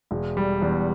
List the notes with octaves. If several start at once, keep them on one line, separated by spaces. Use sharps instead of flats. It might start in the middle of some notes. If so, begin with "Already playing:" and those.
E1
G3
E2